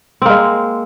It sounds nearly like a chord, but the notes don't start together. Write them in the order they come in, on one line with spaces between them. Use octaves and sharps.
C4 A#3 G#3